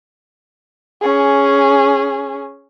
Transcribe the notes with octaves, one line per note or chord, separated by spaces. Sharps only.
C#4 G#4